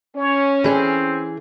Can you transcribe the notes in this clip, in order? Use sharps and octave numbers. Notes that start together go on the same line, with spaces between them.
C#4 C#5
E3 C4 G#4 G#5